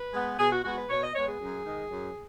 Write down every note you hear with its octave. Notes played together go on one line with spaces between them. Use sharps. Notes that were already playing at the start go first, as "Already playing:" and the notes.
Already playing: B4
G#3 B3
B2 G#4
F#4
G#3 B3 F#4
B4
B2 C#5
D#5
G#3 B3 C#5
G#4
F#2
D#3 G#3
F#2